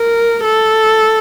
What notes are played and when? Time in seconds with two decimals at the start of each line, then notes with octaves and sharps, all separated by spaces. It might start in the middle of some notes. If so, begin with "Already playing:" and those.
Already playing: A#4
0.44 A4